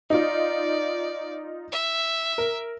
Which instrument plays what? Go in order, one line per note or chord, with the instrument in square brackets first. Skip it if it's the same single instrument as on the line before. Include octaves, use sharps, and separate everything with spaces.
[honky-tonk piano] D#4 F4 [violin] D5
[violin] E5
[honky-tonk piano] A#4